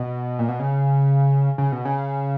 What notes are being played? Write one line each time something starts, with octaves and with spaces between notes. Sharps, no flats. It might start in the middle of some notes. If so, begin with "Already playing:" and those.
Already playing: B2
A#2
B2
C#3
C#3
B2
C#3